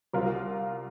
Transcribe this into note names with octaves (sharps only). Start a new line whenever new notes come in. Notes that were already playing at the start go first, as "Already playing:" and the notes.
C2 F4 A#4